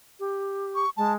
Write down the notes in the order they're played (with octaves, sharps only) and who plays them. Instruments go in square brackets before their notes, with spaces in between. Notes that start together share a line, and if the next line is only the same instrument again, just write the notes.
[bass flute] G4
[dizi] C#6
[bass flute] G#3 [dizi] A5